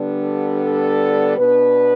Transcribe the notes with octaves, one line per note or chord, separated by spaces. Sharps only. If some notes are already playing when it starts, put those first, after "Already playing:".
Already playing: D3 G3 B3 D4
A4
A4
B2 B3 D4 B4